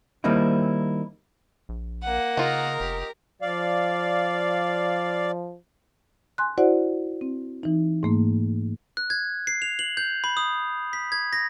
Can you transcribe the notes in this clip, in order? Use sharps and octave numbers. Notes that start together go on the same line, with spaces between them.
D#3 G3 A#3 C4 D#4 E4
A#1
A#3 F#5
C#3 D#4 F4 A#4
F1 G4
F3 D5 F5
G#5 C6 F#6
E4 F#4 C5 D5 F#5
C4
E3 D#4
G#2 A3 A#3
F#6
G#6
C7
F7
F#7
G6
B5
D#6
B6
G#6
A#6